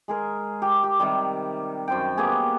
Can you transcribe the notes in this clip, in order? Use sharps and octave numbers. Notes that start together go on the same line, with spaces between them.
G#3 G#4 A#4
G4
G4
C3 D#3 G3
F#2 C5 G5
A#3 B3 G4 G#4